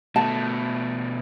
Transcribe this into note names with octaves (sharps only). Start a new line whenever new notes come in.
B2 A3 A5